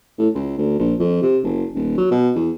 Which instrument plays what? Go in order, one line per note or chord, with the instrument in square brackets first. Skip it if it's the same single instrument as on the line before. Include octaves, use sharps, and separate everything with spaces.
[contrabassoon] A2
C#2
D2
A#1
F2
C3
F#1
D#1
F#3
B2
E2